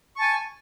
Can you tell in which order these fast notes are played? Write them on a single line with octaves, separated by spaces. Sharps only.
C#6 A5 G#5